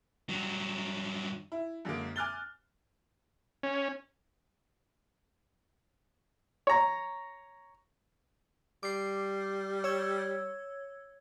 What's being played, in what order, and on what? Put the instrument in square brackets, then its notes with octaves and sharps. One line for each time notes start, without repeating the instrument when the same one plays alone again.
[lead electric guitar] G2 F#3
[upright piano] E4
F#2 D3 G#3 A#3
G#5 D6 F6 F#6 A6 G7
[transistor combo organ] C#4
[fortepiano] C#5 A#5
[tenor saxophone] G3 [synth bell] D6 C7
[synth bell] C#5 E6 G#6